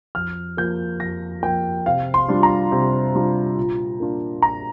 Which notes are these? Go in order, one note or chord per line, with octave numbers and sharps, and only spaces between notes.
F2 F6
F3 A#3 G6
F2 A#6
F3 A#3 G5
C3 F5
C6
G3 D4 F4
A#5
C3
G3 D4 F4
A#2
A#3 D4 F4
A#2 A#5